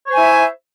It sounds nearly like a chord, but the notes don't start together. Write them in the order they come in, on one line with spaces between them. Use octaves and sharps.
C#5 C5 G#5 E4 E5